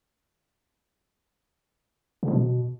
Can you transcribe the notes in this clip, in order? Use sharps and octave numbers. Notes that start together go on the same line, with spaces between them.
C#3
F3
B2